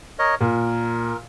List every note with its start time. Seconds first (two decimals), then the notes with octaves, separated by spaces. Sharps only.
0.19 A#4 C#5 D#5
0.41 A#2 A#4